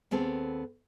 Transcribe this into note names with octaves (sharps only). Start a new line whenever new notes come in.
D#2 B3 C4 G#4 A4